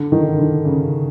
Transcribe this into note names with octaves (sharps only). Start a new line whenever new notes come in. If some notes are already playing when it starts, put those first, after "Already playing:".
Already playing: D3
D#3
D3
C#3